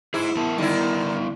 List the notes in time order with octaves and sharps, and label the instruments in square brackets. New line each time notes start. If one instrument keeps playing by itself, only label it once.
[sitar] E4 [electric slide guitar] G#4 C5
[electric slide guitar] B3 A#4 A5
[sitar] D#3 E4 [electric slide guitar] G3 B3 D5